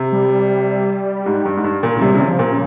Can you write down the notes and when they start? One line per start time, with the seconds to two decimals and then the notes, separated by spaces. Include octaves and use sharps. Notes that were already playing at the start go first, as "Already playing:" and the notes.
Already playing: C3
0.12 G3
1.26 G#2
1.45 G2
1.57 G#2
1.64 G2
1.83 A#2
1.97 C#3
2.02 C3 G3
2.15 C#3
2.20 C3
2.27 F3
2.39 A#2
2.51 C#3